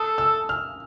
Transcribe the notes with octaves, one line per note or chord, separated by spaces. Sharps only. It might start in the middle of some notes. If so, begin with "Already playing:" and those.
Already playing: A4 D#6
E6
F6